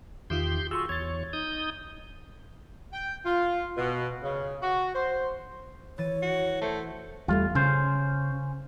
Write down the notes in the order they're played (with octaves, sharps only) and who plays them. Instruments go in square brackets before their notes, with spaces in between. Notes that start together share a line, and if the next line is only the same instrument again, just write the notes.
[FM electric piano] E2 D#3 F4 [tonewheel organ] G4 C6 G6
[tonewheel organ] F4 F#4 G#4 [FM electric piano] C6 C#6 E6
[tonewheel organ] E2 C#5 [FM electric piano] G#6 A6
[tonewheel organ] D#4 D#6 G6
[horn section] G5
F4
B2
C#3
F#4
C5
[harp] E3 A6 D#7 [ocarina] C#5
[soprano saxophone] F#4
[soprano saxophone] A3 [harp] C5 G#6
[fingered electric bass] E2 G3 A3 [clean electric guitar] F4
[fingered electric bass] C#3 [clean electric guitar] C#4 C5